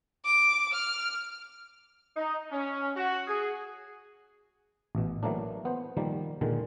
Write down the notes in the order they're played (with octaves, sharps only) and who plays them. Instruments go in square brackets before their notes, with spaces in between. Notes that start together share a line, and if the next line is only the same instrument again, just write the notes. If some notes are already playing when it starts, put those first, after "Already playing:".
[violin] D6
F6
[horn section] D#4
C#4
F#4
G#4
[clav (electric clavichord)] A1 B2
E3 F#3 A3 A#3 D4
B3 C5
D#3 F3 G3 A#3
A#2 D3 D#3 G#3